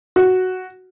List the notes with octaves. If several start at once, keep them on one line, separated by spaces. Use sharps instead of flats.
F#4